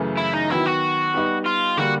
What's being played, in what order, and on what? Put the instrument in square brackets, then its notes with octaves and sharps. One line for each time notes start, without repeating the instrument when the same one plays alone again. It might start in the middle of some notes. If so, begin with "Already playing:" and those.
Already playing: [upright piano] F#2 C#3 E3 A3
[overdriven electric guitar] E4
D#4
[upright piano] D#3 F#3 B3 [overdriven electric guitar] E4
[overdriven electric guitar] F#4
[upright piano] G3 B3 D#4
[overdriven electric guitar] F4
[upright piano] D3 G3 A#3 D4 [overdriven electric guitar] F#4